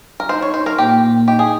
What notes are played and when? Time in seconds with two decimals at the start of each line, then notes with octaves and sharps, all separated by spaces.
0.20 A#4
0.29 D#4 C5
0.42 C#5
0.53 D#4 C5
0.66 A#4
0.78 A#2 G4
1.04 A#2
1.28 D#4 G4
1.39 G#4